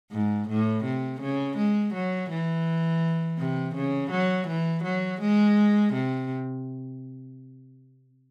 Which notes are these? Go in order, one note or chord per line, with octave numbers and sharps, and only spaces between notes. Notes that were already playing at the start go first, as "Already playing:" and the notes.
G#2
A2
C3
C#3
G#3
F#3
E3
C3
C#3
F#3
E3
F#3
G#3
C3